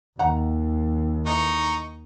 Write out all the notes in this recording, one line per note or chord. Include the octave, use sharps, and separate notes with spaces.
D#2 D#3 F#5 A#5
E3 A3 D#4 A#5 C#6